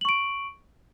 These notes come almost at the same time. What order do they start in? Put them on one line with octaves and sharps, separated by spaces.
F#7 C#6 D7